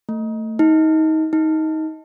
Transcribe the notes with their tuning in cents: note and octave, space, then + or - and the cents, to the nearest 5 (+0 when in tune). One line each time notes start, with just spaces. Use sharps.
A3 +20
D#4 +25
D#4 +20